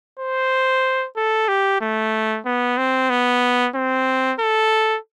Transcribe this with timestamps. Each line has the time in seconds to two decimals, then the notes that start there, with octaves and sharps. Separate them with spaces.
0.19 C5
1.16 A4
1.48 G4
1.81 A3
2.46 B3
2.78 C4
3.10 B3
3.75 C4
4.40 A4